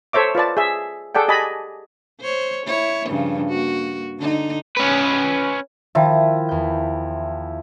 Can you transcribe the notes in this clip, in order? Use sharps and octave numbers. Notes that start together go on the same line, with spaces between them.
A4 C5 C#5 E5 D6
F4 B4 D5 A5
G#4 E5
G#4 A4 D5 F#5 G5
G4 D#5 G#5 A5 B5
C5 C#5
E4 C#5
G2 C#3 F3
A#3 F#4
D3 D#4
C#4 B4
D#3 F3 E4 E5 G5
E2 G6